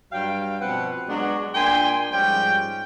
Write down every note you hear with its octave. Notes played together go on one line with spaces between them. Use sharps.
G2 F#3 F5 G5
B2 F3 C4 B4 F#5
F#3 G#3 B3 D4 F#4
A#2 D4 G5 G#5 C6
G#2 F3 G3 C#4 G5